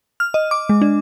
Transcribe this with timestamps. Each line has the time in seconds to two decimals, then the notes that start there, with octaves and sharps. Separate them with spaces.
0.20 F6
0.34 D#5
0.51 D6
0.69 G#3
0.82 D4